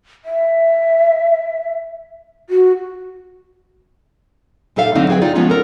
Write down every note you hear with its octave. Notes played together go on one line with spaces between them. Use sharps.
E5
F#4
A#2 G3 D#4 A4 E5 F5
D3 F#3 A3 C4 D4 D#4
F#3 G#4 B4 G5
D#4 F4 D5
F3 G#3 A3 B3 C#4 F4
A4 A#4